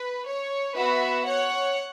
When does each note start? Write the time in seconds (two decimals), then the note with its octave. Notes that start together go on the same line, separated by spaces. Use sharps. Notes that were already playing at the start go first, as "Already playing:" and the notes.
Already playing: B4
0.27 C#5
0.77 B3 F#4 B4 E5
1.26 C#5 F#5